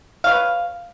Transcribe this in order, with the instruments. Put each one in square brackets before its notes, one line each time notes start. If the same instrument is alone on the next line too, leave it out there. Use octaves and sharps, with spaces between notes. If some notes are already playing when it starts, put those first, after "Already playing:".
[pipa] B4 C#5 F5